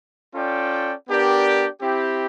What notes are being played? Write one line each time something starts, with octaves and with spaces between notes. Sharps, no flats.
C#4 F4 A4 D5 G5
B3 D4 G4 A#4 D5
C4 E4 G4